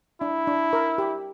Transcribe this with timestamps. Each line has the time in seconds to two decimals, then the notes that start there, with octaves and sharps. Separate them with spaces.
0.21 D4 E4
0.47 D4
0.73 A#4
0.98 G4